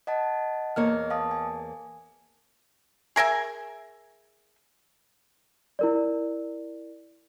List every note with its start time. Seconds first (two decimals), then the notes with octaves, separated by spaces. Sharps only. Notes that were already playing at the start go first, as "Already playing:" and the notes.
0.07 D#5 F#5 A5
0.76 E2 A#3 C#5 D#5 F6
1.10 F5 A5 D#6
1.31 G#5
3.16 G#4 A#4 E5 G#5
5.79 E4 A#4 D5